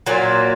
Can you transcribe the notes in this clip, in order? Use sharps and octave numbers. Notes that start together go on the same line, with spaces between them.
A#2 F#3 A#3